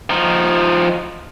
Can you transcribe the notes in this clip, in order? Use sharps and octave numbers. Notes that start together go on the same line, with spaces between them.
F3 D#4